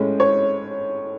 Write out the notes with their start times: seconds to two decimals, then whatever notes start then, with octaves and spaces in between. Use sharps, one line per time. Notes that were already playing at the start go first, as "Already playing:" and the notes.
Already playing: A2 G#3 C#4
0.20 C#5